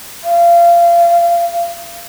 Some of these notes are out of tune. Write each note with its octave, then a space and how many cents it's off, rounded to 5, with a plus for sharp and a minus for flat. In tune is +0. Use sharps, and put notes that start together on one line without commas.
F5 -25